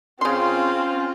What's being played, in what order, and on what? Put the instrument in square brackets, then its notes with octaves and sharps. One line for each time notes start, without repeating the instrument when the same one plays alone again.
[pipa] C#3 C6 [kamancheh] C4 C#4 [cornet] F4